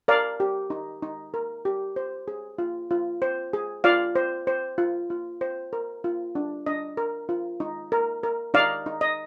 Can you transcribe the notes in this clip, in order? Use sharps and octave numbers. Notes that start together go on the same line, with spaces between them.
A#4 D5 F5
G4
D#4
D#4
A#4
G4
C5
G#4
F4
F4
C5
G#4
F4 D5 F5
C5
C5
F4
F4
C5
A#4
F4
D4
D4 D#5
A#4
F4
D#4
A#4
A#4
D#4 D5 F5
D#4
D#5